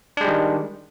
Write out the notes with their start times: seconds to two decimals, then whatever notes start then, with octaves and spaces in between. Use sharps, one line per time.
0.17 D4
0.21 G#3
0.24 G3
0.28 D#3